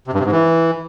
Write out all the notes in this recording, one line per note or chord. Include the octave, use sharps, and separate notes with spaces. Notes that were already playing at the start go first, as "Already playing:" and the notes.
C3
G2
C3
G#2
E3